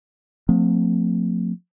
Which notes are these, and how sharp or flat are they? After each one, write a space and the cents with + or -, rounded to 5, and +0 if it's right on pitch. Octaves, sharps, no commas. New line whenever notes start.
F3 +40 A3 +40 C4 +0